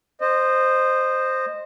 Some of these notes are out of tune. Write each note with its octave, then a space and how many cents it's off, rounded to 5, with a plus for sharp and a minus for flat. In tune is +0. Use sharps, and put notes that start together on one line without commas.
C5 +0 D#5 -20